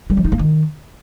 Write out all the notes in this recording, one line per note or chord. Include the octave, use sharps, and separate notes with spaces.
G3
F3
D#4
A#3
D#3